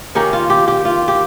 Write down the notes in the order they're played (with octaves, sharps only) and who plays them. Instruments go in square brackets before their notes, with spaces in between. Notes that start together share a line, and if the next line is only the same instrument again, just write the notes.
[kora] D#3 A#3 C#4 G4
F4
G4
G4
F4
G4